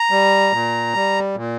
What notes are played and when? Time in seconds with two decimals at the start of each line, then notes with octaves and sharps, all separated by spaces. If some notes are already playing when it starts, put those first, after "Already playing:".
Already playing: A#5
0.11 G3
0.52 A#2
0.94 G3
1.36 A#2